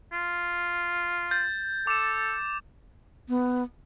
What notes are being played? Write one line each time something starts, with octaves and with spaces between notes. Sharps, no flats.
F4
G6 A6
A4 D6 E7
B3